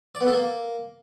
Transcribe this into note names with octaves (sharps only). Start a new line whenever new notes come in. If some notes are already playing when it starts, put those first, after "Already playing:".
D5
B3
A4
A#3